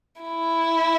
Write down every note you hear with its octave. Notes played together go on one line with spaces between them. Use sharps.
E4